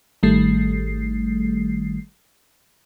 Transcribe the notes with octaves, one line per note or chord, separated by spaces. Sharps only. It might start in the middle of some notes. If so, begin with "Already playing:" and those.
G#1 D#3 G3 A3 C7